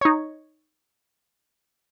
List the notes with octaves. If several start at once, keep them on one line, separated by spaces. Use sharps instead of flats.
D#4 C#5